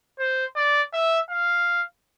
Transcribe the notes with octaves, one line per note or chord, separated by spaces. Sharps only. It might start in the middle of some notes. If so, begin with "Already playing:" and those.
C5
D5
E5
F5